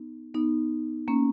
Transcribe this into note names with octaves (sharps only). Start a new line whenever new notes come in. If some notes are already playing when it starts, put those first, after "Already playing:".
Already playing: B3 D#4
B3 D#4
A#3 C#4